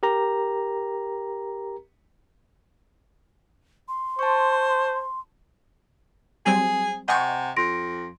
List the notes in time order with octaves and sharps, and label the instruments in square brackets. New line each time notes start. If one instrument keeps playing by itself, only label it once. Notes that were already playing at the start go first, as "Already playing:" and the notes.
[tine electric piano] G4 A#4 A#5
[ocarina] C6
[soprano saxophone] C5 [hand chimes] A5 C#6
[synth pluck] F#3 G3 C4 [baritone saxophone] G#4
[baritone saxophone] C3 [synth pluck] D#5 C#6 [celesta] F#5 G#5
[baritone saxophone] F2 [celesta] C6 A#6 D7